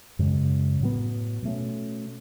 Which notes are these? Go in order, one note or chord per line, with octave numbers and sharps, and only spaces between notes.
F#2 C#3 G#3
A2 F#3 B3
B2 A3 C#4